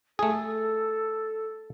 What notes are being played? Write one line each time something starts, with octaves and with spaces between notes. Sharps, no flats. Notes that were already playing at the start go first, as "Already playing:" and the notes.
A3 G#4 A4